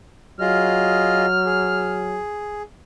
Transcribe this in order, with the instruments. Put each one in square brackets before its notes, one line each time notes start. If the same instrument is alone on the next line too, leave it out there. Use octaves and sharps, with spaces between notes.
[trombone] F#3 [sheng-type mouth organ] F4 G#4 D#5 [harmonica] F6
[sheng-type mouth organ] G#4